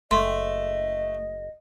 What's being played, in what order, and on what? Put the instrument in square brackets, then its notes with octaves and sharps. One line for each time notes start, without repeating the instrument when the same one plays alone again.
[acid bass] F#1 [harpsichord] A3 [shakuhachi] D#5 [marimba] C6